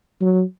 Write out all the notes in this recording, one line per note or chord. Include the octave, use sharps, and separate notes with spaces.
F#3